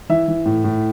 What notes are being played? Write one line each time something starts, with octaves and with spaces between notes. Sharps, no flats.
E3 E5
E3
A2
A2